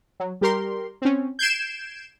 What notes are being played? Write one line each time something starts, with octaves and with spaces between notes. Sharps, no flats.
F#3
G3 G4 A#4 C6
C4 C#4
G6 G#6 C7 D7 E7